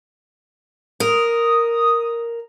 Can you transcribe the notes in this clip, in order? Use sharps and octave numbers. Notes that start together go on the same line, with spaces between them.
A#4 D#6